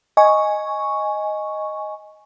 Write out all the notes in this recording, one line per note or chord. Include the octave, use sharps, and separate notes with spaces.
D#5 G#5 C#6